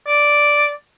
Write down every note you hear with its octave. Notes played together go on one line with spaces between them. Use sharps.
D5